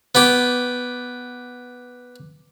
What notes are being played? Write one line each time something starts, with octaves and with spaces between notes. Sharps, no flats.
B3 G4